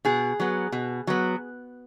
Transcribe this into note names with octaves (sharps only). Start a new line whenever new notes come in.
B2 G#4
F#3 B3
B2
F#3 B3